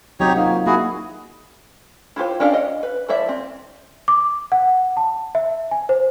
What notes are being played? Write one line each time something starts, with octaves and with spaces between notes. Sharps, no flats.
F#3 C4 D#4 F#4 G4 C#5
A#3 D#4 F4
A#3 E4 F#4 G#4
E4 F4 G4 C5
C#4 D4 G4 A#4 F5
D#5 F#5
B4
F3 E4 C5 D5 E5
C4
D6
F#5
A5
E5
G#5
C5